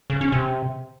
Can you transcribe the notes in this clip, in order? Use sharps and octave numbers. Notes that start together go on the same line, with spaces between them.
C#3
C#4
C3